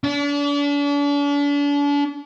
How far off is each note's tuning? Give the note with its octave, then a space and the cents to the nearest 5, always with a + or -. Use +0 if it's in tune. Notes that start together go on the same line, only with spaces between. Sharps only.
D4 -40